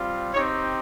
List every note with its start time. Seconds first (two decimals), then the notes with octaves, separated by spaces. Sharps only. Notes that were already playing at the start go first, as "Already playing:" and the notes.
Already playing: G3 C4 F4
0.33 C4 D#4 G4 C#5